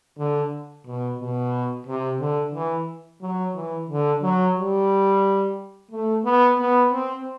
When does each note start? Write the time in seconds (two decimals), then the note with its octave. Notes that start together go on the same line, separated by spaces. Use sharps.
0.18 D3
0.86 B2
1.20 B2
1.87 C3
2.20 D3
2.54 E3
3.21 F#3
3.55 E3
3.89 D3
4.23 F#3
4.56 G3
5.91 A3
6.25 B3
6.59 B3
6.93 C4